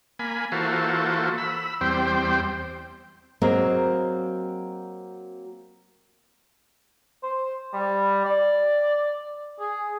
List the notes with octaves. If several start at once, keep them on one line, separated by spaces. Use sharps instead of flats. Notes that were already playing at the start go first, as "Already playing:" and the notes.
A#3 G#5 B5
E3 A#3 F4 F#4 A4 C5
B5 E6
E2 G3 C4 C5 G5
F#3 A#3 C4 F#4 G#4 D#5
C5
G3
D5
G#4